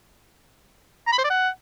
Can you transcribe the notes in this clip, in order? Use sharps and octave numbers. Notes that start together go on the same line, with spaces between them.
A#5
B5
C5
D5
F#5